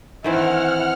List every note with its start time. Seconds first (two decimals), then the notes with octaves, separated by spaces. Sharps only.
0.24 D#3 E3 C4 E4 F#5 F6